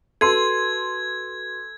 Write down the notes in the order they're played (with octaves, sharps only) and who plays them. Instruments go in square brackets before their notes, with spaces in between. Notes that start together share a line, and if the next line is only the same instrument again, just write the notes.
[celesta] F#4 B4 D#7 [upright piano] A4 C6 [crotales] G#6